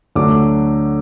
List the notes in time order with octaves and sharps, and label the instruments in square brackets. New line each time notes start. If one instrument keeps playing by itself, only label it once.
[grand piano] D2 D3 F#3 A3 D4 D6